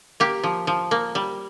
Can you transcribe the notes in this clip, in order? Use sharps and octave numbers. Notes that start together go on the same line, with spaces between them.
A#3 G4
F3
F3
A#3
G3